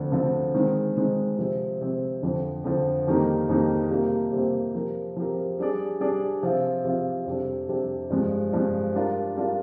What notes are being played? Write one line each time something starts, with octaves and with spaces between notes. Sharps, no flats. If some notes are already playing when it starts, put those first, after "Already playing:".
Already playing: D2 D3 F3 C4
D2 D3 F3 C4
D#3 G#3 C4
D#3 G#3 C4
C3 F3 C4
C3 F3 C4
F2 D3 F3
F2 D3 F3
F2 D#3 G3 A#3 D#4
F2 D#3 G3 A#3 D#4
C3 G3 A#3 F4 C5
C3 G3 A#3 F4 C5
F3 C4 G4 A#4
F3 C4 G4 A#4
G3 D4 G#4 D5
G3 D4 G#4 D5
C3 F3 C4 F4
C3 F3 C4 F4
F2 C3 G3 D4
F2 C3 G3 D4
G2 F3 G#3
G2 F3 G#3
G3 D4 F4 A#4
G3 D4 F4 A#4